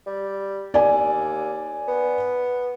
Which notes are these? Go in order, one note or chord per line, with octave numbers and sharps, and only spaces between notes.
G3
D#2 D5 G#5
B3